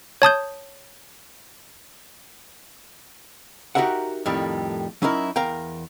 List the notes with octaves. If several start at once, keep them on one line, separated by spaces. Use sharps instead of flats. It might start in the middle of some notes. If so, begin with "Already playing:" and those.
C#5 A5 D#6 G6
D#4 F#4 G4 A#4 E5 F#5
F2 A2 D#3 G3
F#3 C#4 D#4 E4 A#4
E2 A#4 F5 G5